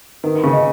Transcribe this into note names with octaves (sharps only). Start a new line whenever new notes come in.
D#3 B4
D#3
C#3
D#5